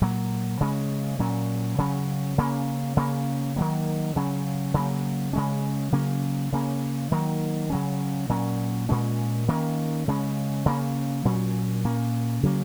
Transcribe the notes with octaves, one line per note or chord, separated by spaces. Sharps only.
A#2 F#3 A#3
C#3 G#3 C#4
A#2 F#3 C#4
C#3 F#3 C#4
C#3 A#3 C#4
C#3 A#3 C#4
D#3 F#3 A#3
C#3 F#3 C#4
C#3 F#3 A#3
C#3 G#3 C#4
C#3 F#3 A#3 C#4
C#3 A#3 C#4
D#3 F#3 A#3
C#3 F#3 C#4
A#2 F#3 C#4
A#2 G#3 C#4
D#3 A#3 C#4
C#3 G#3 C#4
C#3 A#3 C#4
A#2 F#3 C#4
A#2 A#3 C#4
C#3 F#3 A#3 C#4